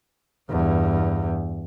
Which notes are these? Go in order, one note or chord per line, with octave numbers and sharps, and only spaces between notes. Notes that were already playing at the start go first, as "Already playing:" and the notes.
E2 G2